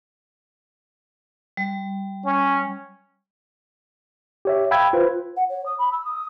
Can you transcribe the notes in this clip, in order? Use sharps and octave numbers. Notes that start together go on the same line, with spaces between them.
G3
C#4
G4 C#5 E5
F5 G5 B5 E6 G#6
F4 B4 C5
F#5
C#5
D#6
B5
E6
D#6